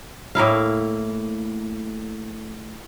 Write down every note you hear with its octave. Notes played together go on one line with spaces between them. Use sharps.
A2 A#3 E4 F5